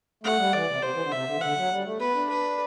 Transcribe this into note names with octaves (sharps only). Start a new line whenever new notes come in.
A3 F#5
G3
E3 D5
C3
C3 C5
E3
D3
C3 E5
D3
E3
D3 F#5
F#3
G3
A3
B3 B4
D4
B4